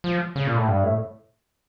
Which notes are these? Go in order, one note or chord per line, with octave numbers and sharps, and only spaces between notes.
F3
C#3
A#2
A2
G2
A2